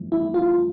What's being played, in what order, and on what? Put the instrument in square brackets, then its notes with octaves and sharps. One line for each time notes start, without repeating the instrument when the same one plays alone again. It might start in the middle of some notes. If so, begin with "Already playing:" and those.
Already playing: [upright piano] G1 F2 E3 A3
[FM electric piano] E4
F4